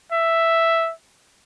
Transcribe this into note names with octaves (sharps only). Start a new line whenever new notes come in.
E5